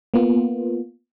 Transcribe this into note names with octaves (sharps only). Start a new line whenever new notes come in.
A#3 B3 F4